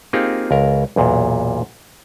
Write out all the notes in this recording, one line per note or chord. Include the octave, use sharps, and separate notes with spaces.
A#3 C4 D#4 F4 G4 G#4
C#2 A#4
B1 E2 A#2